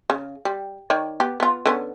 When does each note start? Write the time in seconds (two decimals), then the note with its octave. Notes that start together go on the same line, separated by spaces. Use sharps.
0.10 C#3
0.45 G3
0.90 D#3 C#5 D5
1.20 B3 G4
1.40 B3 F4
1.66 D3 B3 C#4